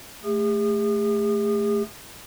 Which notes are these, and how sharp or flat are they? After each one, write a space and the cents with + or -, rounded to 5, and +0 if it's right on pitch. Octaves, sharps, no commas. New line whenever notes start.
A3 +0 G#4 -40